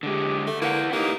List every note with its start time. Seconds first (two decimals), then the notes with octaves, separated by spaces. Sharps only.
0.03 D3 G#3 G4
0.47 D3 A3
0.62 A#3 E4 B4 F#5
0.93 A#3 D#4 E4 G4 B4